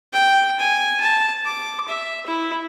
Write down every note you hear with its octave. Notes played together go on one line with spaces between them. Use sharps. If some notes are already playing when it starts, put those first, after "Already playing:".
G5
G#5
A5
D6
E5
E4